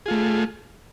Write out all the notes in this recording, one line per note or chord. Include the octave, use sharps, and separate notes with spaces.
A3 F4 G#4